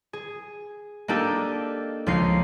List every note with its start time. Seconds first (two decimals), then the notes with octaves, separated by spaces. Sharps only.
0.13 G#4
1.08 A#3 D4 D#4 G4 A4
2.06 C#2 F3 D#4 C7